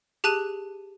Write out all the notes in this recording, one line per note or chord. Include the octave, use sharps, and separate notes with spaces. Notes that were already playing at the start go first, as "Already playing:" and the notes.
G4 G#4 A5 F#6 D#7